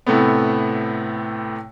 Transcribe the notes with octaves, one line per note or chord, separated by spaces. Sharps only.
A2 C3 A3 B3